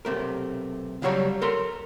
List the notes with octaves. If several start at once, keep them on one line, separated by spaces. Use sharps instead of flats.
B1 C3 A3 A#4
C#3 F#3 G3 C#5 A#5
A4 A#4 A#5 C6